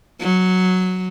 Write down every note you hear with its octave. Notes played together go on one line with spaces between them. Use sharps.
F#3